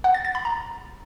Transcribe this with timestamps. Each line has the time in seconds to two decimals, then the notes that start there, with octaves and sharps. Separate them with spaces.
0.04 F#5
0.14 A6
0.25 A6
0.35 B5
0.45 A#5